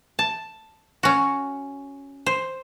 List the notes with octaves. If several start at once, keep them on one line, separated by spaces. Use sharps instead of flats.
A5
C#4 F#4
C5